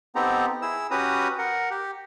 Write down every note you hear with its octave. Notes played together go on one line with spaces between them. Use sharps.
B3 C4 D#4 G4 A4 A#5
E4 G#4 E6
C#4 F#4 G4 B4 A#5 D#6
A#4 F#5
G4